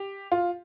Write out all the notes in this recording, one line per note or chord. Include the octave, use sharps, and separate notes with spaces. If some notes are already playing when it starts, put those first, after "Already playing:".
Already playing: G4
F4